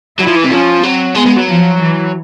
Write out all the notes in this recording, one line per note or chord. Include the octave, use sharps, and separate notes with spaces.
F#3 E4
F3
E3
C3
F3 C#4
F#3 C4
G#3 B3
G#3
F#3
F3
E3